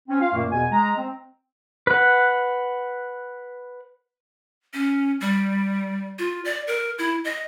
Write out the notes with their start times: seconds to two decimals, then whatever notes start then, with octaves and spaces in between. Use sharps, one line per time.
0.08 C4 C#4
0.20 F4 F5
0.32 F#2 A#2 D#3 A3 A#3
0.51 E2 B2 G#5
0.71 G#3 A#5
0.97 C4
1.87 B4 F#5
4.73 C#4
5.21 G3
6.19 F4
6.45 D5
6.67 A#4
6.98 E4
7.24 D#5